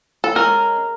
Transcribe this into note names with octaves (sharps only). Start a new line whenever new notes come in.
A4
G#3 C#4 A#4